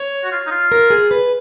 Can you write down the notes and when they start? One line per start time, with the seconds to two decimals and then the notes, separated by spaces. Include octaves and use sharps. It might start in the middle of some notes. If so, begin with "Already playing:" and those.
Already playing: C#5
0.24 F#4
0.32 F4
0.46 D#4
0.51 F4
0.72 A#4
0.90 G#4
1.11 B4